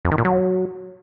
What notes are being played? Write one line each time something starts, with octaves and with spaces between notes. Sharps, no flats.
F2
D#3
A#2
F#3